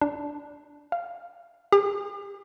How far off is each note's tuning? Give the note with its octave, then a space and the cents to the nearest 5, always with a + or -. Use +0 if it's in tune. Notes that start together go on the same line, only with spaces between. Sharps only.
D4 -5
F5 -10
G4 +45